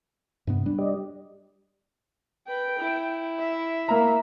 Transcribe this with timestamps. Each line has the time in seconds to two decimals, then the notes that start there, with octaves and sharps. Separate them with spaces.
0.47 G2 C3 B3
0.66 G3 D4
0.79 G4 D5 D#5
2.47 B4 G5
2.78 E4
3.39 E5
3.88 A#3 A#5